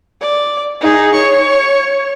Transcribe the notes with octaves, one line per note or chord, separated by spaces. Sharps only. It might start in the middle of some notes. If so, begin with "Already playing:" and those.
D5
D#4 G#4
C#5 C#6